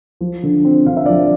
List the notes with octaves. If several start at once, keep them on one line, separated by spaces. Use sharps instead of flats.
F3
D3
C4
D3 F5
E5
F3 D5 F5